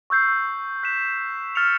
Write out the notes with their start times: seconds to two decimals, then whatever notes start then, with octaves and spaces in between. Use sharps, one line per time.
0.10 C#6 E6 G6 C7
0.83 F#6 B6 E7
1.55 F6 A6 C#7 F7